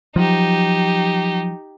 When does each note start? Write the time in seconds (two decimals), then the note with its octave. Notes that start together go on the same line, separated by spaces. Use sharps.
0.16 F3 F#3 D#4 G4